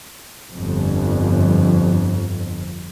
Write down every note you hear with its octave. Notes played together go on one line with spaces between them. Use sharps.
G1 F2